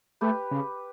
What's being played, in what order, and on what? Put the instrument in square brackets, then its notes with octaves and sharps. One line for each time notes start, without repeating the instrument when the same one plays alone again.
[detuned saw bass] A3 [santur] G4 B4
[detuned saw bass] C#3